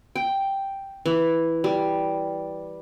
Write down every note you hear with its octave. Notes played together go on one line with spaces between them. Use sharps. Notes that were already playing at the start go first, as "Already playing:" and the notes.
G5
E3
G3